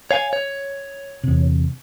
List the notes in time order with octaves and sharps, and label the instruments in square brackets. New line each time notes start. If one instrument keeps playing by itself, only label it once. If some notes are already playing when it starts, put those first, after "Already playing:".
[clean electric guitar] C#5 F5 G#5
C#5
[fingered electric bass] E2 C3